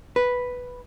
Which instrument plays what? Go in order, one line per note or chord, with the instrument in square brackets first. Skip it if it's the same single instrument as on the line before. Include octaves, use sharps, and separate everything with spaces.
[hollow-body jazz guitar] B4